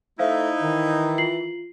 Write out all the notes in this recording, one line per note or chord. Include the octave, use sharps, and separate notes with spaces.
A3 D#4 E4 C5 E5 F5
D#3 E3
F4 C7 F#7